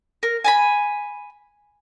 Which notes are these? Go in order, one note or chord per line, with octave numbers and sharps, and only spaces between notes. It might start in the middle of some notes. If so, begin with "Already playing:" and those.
A#4
G#5 A5 B5